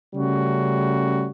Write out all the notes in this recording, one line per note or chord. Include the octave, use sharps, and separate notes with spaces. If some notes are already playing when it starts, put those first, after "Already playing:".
C#3 G3 A3 C#4 F#4